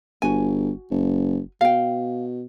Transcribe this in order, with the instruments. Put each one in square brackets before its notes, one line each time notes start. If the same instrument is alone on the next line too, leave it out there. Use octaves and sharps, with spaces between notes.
[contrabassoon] G1 [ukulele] F#4 G#5
[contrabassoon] F#1
[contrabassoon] B2 [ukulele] F5 G5